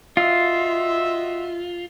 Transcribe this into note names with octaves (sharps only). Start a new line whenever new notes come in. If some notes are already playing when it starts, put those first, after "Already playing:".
F4 F#4 D#5 E5